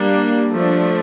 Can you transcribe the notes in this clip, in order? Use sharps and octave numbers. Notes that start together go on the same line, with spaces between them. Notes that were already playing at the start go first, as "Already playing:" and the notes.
Already playing: G3 A#3 D4
F3 A3 D4